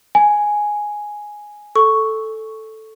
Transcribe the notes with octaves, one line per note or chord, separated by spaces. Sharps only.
G#5
A4 C#6